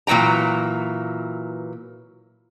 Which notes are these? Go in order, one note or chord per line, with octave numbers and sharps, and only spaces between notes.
A#2 E3 F#3 G5 A#5